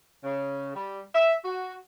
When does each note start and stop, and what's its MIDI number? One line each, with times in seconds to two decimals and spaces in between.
0.24 0.74 49
0.75 1.01 55
1.14 1.33 76
1.44 1.75 66